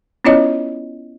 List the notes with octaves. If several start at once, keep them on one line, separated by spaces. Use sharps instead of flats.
B3 C#4 E4 F4 C#5 D#5